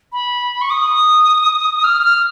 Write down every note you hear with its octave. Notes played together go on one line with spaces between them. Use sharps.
B5
C#6
D#6
F6
F6